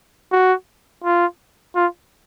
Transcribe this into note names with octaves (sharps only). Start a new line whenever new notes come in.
F#4
F4
F4